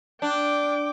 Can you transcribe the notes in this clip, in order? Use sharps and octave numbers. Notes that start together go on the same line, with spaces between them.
D4 G5 D6